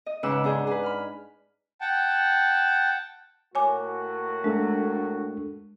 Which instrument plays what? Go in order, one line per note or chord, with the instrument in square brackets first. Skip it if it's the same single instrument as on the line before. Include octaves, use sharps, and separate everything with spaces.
[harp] D#5
G#2 C#3 B4 F#5 D6 E6
D4 D#4 G#4 C5
G#4 B4
B5 F6
[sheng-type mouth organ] F#5 G5 A5
[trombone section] A2 A#3 F#4 [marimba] C#5 G#5 D6
[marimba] G#3 [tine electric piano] A3 D4 A4